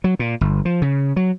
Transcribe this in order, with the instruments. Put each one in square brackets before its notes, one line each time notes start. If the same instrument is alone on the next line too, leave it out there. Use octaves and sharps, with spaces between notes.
[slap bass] F#3
A#2
G1
F3
C#3
F#3